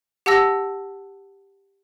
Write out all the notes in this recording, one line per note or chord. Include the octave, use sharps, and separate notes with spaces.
G4 F#5 A5 E6 A#6